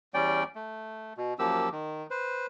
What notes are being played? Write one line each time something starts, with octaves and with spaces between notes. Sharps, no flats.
E2 G3 C#4 D5 G5
A3
B2
F#2 F3 A#3 G4 E6
D#3
B4 C5